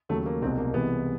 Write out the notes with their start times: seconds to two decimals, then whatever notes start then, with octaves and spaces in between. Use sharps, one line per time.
0.09 D#2 C#3 F#3 A3
0.26 A#3
0.42 C2 B2 G#3 C4
0.58 A#3
0.74 C2 C3 E3 G#3 B3